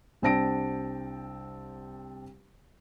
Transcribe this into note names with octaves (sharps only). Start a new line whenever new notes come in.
C2 C4 D4 A5 A#6 D7